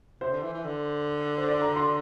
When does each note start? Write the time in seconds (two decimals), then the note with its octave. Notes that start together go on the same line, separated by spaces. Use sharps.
0.21 C3 C5
0.32 D3
0.43 E3
0.54 E3
0.64 D3
1.38 C5
1.49 D5
1.62 A#5
1.76 C6